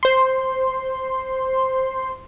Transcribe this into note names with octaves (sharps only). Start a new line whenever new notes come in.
C5 C6